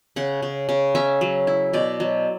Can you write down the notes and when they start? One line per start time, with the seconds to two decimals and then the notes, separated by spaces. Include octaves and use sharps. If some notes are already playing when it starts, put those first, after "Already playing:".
0.16 C#3 F#5
0.42 C#3
0.69 C#3
0.95 C#4 E5
1.21 F#3
1.47 E4
1.73 B2 D5
2.00 F#3